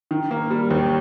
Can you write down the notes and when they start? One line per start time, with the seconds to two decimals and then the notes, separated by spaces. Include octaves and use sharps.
0.11 D#3
0.31 A#3
0.50 G3
0.71 D#2